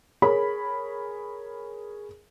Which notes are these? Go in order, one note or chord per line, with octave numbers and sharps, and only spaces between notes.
G#4 A#4 C#5 B5